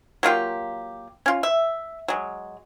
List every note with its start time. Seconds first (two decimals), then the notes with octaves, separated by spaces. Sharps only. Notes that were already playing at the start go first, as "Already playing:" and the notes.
0.23 F#3 A#3 F4 G4
1.26 C#4 F4
1.43 E5
2.08 F#3 G#3